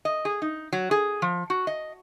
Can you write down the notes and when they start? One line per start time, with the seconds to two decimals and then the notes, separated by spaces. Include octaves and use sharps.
0.05 D#5
0.25 G#4
0.42 D#4
0.73 F#3
0.91 G#4
1.22 F3
1.50 F#4
1.67 D#5